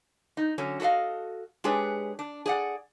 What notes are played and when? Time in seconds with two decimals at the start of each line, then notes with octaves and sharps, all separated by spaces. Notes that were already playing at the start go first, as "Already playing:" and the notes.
0.37 D#4
0.58 D3 F#3 C#4
0.80 F#4 A4 B4 D#5 F5
1.64 G#3 D4 G4 G#4 B4 C#5
2.19 D4
2.46 G#4 D5 F#5